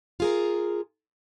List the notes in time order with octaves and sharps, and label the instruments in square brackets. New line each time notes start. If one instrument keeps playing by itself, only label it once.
[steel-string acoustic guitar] F4 G#4 A#4